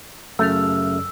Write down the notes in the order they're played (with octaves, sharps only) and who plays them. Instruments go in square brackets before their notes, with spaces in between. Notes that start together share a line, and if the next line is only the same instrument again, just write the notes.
[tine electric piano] F#2 C#3 F6 [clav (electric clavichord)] A3 [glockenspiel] E6